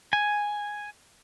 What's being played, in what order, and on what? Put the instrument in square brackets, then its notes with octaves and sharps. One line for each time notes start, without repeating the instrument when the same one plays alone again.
[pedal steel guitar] G#5